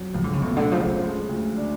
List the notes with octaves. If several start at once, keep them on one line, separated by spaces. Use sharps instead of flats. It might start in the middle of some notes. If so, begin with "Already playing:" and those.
Already playing: F2 F#3
C#2 F3
D3
C#3
B2 A3
D3
C#3 F3
F#3
G#3
D2
D4